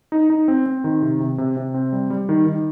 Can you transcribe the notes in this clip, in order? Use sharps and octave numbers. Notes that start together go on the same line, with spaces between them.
D#4
D#4
C4
C4
D#3
C3
C3
C3
C3
C4
G3
G3
D#3
D#3